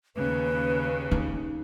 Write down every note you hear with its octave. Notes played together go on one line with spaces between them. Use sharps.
D#2 C#3 B4
D#4